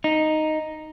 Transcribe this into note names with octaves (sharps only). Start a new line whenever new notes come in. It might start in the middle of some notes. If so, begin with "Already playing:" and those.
D#4